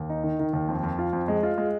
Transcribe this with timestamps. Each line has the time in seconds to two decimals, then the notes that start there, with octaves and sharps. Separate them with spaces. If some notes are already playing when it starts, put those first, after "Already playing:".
Already playing: D#2
0.09 D#4
0.24 D#3
0.39 D#3
0.53 D#2
0.69 F2
0.84 F2
0.99 F4
1.13 F2
1.28 G#3
1.43 F4
1.58 G#3